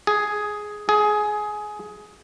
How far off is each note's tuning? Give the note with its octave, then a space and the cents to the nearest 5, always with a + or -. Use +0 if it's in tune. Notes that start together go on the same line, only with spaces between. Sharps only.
G#4 +5
G#4 +15